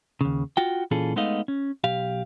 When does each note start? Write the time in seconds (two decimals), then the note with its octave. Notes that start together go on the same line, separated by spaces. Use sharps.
0.21 D#2 C#3
0.57 F4 F#4 G5
0.91 A#2 E3 C#4 F4 G#4 A4
1.16 G#3 A3 B3 D#4 D#5 F5
1.48 C#4
1.84 B1 G4 F5